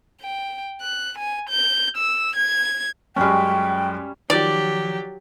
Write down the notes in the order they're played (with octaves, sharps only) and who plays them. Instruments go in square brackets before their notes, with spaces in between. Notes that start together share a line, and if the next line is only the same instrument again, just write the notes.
[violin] G5
F#6
G#5
G6
E6
G#6
[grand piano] F#2 G#3 [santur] G3 C#4 [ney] G5
[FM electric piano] D#3 F3 [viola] F#3 G4 [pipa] D5